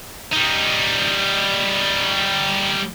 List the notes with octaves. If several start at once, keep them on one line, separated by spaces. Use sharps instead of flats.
G3 D#4